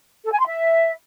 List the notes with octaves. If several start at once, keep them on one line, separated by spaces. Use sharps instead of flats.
A4
G#5
C6
E5